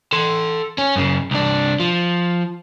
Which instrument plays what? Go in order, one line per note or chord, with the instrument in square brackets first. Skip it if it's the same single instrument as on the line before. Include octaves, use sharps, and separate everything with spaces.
[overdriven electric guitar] A4 C6
C#4
F#2 C#3
C2 D4
F3